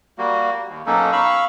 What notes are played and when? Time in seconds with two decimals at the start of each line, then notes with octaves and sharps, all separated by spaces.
0.18 G3 A#3 F#4
0.68 D#2
0.86 B2 F#3 A#3 C#4 D#4 A4
1.12 F5 B5 C#6 E6